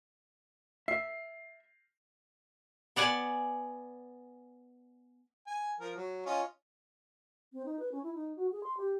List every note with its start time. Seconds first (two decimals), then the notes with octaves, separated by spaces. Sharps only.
0.88 E5 C7
2.96 B3 D5 F#5 G#5
5.47 G#5
5.80 F3 A#4
5.96 F#3
6.26 C#4 F4 D#5
7.53 C4
7.65 D#4
7.79 B4
7.92 C#4
8.03 E4
8.14 D#4
8.36 F#4
8.52 G#4
8.63 C6
8.77 G4